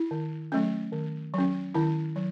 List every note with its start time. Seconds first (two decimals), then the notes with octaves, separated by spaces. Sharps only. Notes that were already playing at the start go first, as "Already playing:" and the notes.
Already playing: E4
0.11 D#3
0.52 F#3 A3 C#4
0.93 D#3
1.34 F#3 C#4
1.74 D#3 E4
2.16 F#3